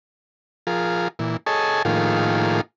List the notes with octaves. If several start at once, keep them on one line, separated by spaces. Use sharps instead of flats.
F3 F4 G#4 A#4
A#2 E3
G#4 A4 C#5 D#5 G#5 A5
A2 D#3 F3 A#3 F4 G#4